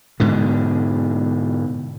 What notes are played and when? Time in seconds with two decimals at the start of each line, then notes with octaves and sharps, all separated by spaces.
0.20 G#2 B2 D3